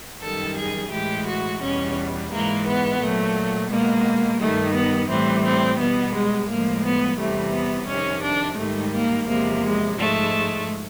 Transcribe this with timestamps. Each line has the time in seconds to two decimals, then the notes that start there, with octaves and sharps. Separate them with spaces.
0.23 F#2 D#3 G3 A4
0.58 G#4
0.92 A2 E3 G#3 G4
1.27 F#4
1.62 E2 B2 G3 C#4
2.31 G#2 E3 G#3 A#3
2.67 B3
3.01 A#2 F#3 A3
3.71 B2 G#3 A#3
4.41 G2 D#3 G3 A3
4.75 B3
5.10 A2 E3 G3 C4
5.45 C4
5.80 B2 G3 B3
6.15 G#3
6.49 A2 F3 G#3 A#3
6.85 B3
7.19 E2 C3 E3 G3 A3
7.54 B3
7.89 F2 C3 D#3 C#4
8.23 D4
8.58 G#2 D#3 G3 A3
8.94 A#3
9.28 E2 C3 F3 G#3 A#3
9.63 G#3
9.97 G#2 F3 G#3 A3